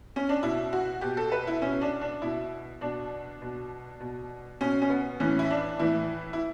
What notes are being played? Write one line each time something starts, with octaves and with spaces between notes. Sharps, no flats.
C#4
D4
B2 E4
F#4
B2 G4
A4
B4
E4
B2 C#4
D4
D4
B2 E4
B2 D4
B2
B2
B2 C#4
C#4
B3
A2 E3 C#4
E4
D4
A2 E3 E4
E4